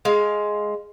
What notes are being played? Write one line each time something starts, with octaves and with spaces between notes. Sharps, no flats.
G#3 F5